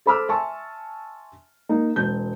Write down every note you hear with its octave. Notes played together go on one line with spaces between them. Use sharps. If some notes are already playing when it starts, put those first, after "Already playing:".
A4 C5 B5 D6 E6 F6
E5 G#5 A5 C6 C#6 E6
A#3 D#4
E1 C4 G6